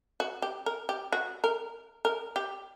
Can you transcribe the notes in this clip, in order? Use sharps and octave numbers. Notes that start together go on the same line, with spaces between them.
F#4
G4
A#4
G4
F#4
A#4
A#4
G4